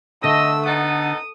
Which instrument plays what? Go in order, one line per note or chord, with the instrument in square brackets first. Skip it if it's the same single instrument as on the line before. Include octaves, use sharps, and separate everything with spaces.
[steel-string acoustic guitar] D3 [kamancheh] A3 E6 [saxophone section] D#5
[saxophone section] B3 D#4 A4 [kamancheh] D#6